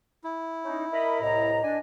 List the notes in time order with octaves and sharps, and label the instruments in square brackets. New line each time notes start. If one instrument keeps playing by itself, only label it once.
[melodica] E4
[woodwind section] C#4 D#4
[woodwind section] A#4 D#5 B5 [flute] E5
[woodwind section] C2 A2 A#5 [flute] D#5
[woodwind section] D4 [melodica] G#5